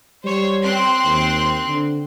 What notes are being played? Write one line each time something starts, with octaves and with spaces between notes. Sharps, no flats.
G3 C5 C#5
C4 C6 F#6
D#2
D3